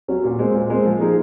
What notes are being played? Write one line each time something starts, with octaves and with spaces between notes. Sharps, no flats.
F#3 C#4
A#2
G#3 C4
A#2
G#3 C4
F3
A#3 D#4 G#4